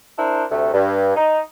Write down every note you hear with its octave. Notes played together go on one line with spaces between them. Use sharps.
D4 E4 A#4 C5
D2 C3 A3
G2
D#4